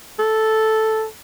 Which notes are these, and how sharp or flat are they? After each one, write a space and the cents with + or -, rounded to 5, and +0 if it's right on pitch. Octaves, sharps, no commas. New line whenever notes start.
A4 -5